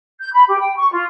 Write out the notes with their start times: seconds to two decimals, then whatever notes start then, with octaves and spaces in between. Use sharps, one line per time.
0.20 G6
0.33 B5
0.47 G4
0.59 G5
0.76 C#6
0.92 F4